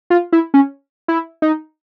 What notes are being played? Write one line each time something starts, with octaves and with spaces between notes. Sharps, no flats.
F4
E4
C#4
E4
D#4